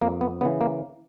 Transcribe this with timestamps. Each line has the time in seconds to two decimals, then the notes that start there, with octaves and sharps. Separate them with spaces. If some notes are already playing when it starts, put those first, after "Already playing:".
0.01 F2 A#3
0.21 B3
0.41 C#3 E3 B3
0.61 A#3